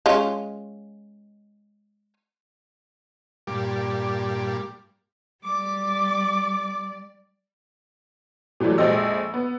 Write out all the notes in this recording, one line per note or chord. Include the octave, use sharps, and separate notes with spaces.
G#3 C#4 F4
G2 A#2 G3 D5
G3 D5 D6
C3 E3 F#3 G3 A3
A#1 F2 G#3 C4 D#5 E6
B3